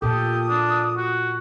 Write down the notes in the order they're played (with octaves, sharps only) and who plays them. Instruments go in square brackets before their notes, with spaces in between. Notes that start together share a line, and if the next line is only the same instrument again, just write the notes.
[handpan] A#2 A4 [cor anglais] G4 [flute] D#6
[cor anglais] D4
F#4